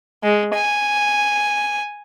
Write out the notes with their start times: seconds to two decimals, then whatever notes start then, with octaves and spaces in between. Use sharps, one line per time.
0.23 G#3
0.54 G#5